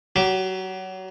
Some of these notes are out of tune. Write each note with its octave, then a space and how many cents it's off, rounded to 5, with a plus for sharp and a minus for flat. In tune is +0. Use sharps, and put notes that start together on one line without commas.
F#3 +25 G4 +0 D6 +0